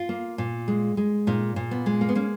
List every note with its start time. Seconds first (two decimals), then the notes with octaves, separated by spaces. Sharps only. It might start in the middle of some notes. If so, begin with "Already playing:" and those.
Already playing: F4
0.09 A#3
0.38 A#2
0.68 G#3
0.97 G#3
1.27 A#2 D#4
1.56 A#2
1.71 B3
1.86 G#3
2.01 A#3
2.09 B3
2.15 A#3 C#4